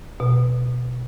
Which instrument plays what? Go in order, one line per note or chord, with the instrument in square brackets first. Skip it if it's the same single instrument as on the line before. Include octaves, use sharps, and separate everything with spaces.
[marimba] B2